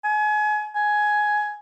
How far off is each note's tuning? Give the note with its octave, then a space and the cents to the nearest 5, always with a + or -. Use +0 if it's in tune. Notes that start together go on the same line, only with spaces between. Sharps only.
G#5 +30
G#5 +10